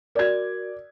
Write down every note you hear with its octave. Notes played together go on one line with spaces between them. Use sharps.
F#4 A#4 D5 G#6